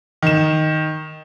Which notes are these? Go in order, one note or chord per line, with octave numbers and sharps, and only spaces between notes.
D#3 E7